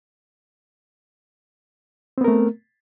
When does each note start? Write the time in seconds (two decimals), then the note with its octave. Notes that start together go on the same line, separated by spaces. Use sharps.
2.18 C4
2.21 B3
2.24 A#4
2.28 A3